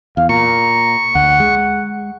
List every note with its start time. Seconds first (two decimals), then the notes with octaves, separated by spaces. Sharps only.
0.17 E2 F5
0.29 A#2 A#5 C#6
1.15 D2 F#5
1.40 G#3